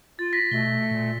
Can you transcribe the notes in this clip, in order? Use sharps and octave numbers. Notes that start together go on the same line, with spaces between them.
F4 A6
A#6 B6
B2 A3 G7
A#2